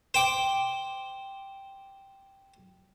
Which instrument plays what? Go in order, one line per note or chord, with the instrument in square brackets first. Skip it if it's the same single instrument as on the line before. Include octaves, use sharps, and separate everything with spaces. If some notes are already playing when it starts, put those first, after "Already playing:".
[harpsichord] C5 G5 D6